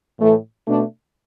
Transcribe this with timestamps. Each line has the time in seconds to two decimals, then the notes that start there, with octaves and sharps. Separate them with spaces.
0.18 A2 E3 A3
0.66 B2 A3 D4